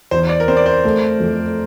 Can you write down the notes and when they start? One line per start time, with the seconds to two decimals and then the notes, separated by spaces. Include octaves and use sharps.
0.11 E2 C5
0.29 D5
0.40 A#4
0.48 C4 C5
0.57 D5
0.66 C5
0.85 A3
1.20 F2